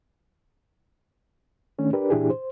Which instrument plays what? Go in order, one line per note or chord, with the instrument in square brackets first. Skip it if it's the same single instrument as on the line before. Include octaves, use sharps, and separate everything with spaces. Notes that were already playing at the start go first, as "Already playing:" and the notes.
[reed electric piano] D#3 A3 C#4 D4
D4 G4 A#4 B4 D5
A#2 E3 D4 E4 G4 G#4
C5